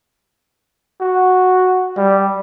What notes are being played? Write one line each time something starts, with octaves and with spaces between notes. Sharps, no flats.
F#4
G3